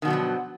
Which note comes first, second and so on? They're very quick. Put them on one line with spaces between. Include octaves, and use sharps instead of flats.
D#3 B2 F#3 G2 F3